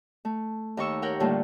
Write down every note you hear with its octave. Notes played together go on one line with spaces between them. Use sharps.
A3
D#2 D#4 C#6 E6
G4 A#4 C#5 F#5 G5
A2 D3 G3 A3 A#3 F4